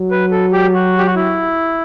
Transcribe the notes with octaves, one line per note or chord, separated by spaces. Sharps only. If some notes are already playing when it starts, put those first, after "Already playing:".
Already playing: F#3
B4
A4
G4
F#4
G4
F#4
E4